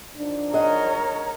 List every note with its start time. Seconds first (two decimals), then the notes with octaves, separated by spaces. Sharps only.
0.18 D#3 F3 D4
0.53 G#4 A#4 C#5 D#5 F#5